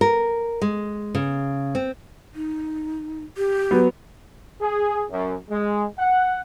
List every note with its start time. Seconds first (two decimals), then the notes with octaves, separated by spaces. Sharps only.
0.01 A#4
0.61 G#3
1.15 C#3
1.75 C4
2.35 D#4
3.37 G4
3.71 F#3 B3
4.61 G#4
5.11 F#2
5.50 G#3
5.99 F#5